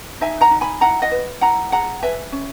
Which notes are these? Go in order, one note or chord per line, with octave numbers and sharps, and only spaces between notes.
D#4 E5 G#5
F#5 A#5
D#4
G#5 B5
E4 F#5 A#5
D#5 F#5
B4
E4 F#5 A#5
G#4 F#5 A#5
B4 E5 G#5
C#4